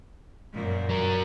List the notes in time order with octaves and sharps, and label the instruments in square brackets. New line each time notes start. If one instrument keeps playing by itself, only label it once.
[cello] F#2 A#2
[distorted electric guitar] F#3 A#4